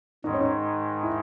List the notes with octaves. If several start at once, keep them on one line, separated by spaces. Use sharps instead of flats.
G#2 D#3 G#3 D#4
C#4
D#4
E4